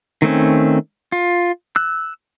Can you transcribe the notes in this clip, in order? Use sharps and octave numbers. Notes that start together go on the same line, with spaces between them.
D#3 A3 C4 C#4
F4
E6 F#6